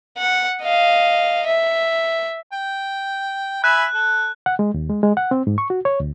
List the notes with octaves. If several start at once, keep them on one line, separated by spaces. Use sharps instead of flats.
F#5
D#5 F5
E5
G5
E5 G#5 B5 F#6
A4
F#5
G#3
D#2
G#3
G#3
F#5
C4
G#2
C#6
F#4
C#5
D2